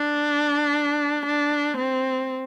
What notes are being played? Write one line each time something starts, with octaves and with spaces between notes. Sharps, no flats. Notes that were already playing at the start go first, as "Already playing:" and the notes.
Already playing: D4
D4
C4